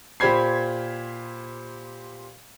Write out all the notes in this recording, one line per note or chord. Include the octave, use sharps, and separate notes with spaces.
A#2 G4 C5 B5 G#6 C7